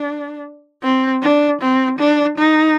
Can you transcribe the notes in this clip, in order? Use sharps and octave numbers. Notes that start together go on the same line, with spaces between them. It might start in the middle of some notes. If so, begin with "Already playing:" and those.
Already playing: D4
C4
D4
C4
D4
D#4